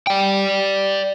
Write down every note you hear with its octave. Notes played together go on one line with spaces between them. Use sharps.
D5 G5